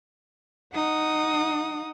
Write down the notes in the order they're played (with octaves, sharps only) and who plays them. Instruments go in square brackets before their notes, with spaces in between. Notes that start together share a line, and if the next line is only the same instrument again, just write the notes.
[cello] D#4 [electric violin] F#5 D#6